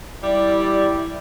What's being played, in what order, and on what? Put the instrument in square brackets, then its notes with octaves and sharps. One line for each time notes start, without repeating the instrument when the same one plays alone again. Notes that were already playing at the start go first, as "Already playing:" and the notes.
[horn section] G3 D5 [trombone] E4